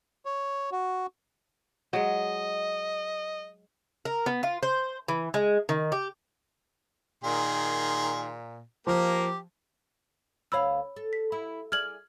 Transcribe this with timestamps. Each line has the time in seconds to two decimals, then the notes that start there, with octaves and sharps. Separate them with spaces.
0.25 C#5
0.72 F#4
1.93 F#3 G#3 D#5
4.05 A#4
4.26 B3
4.43 F4
4.63 C5
5.08 E3
5.34 G#3
5.69 D#3
5.92 G4
7.24 A#2 D#3 G#4 C6
8.87 F3 A#3 G4 A#4
10.52 D2 C#5 F5 B5 E6
10.96 A4
11.13 B6
11.32 E4
11.72 G#4 D5 F6 G#6 F#7